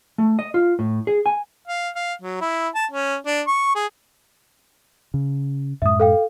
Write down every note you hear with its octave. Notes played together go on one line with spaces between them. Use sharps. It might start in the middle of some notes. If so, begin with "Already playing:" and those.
A3
D#5
F4
A2
G#4
G#5
F5
F5
F#3
E4
A5
C#4
D4
C#6
G#4
C#3
F#2 A2 G#3 E5 D#6
A4 F5 G5